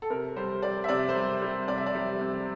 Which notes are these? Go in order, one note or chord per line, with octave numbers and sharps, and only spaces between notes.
A4
C3 A#4
G3 C5
G3 D5
E5
C3 D5
C5
G3
G3
C3 D5
E5
D5
G3
C3